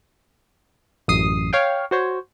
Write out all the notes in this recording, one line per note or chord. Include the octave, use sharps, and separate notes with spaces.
A1 F#2 D#6 C7
C#5 F5 G5
F#4 C5 C#5